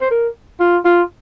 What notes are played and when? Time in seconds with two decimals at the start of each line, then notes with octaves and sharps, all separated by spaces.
0.01 C5
0.11 A#4
0.60 F4
0.85 F4